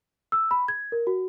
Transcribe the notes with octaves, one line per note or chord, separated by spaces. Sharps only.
E6
B5
G#6
A#4
F#4